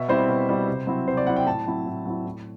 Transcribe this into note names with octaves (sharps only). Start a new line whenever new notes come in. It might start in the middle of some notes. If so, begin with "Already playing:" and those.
Already playing: B2 E5
G3 C4 E4 C5
B2
G3 C4 E4
C3
F#3 C4 E4
C3 C5
D5
F#3 C4 E4 F#5
G5
A2 A5
F#3 C4 E4
A2
F#3 C4 E4
A2